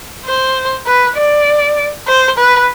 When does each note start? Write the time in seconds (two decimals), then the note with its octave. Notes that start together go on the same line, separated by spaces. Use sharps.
0.25 C5
0.86 B4
1.16 D5
2.07 C5
2.38 B4